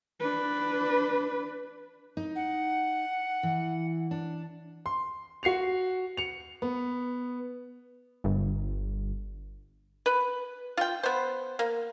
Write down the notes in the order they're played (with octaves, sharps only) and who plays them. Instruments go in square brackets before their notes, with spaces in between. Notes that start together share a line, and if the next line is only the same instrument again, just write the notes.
[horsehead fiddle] D4 B4
[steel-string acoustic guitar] D#4
[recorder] F#5
[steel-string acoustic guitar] E3
D4
[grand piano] C6
F#4 C7 C#7 F7
C#7 F7
B3
[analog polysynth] G1
[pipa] B4
F4 G5
B3 C5
A#3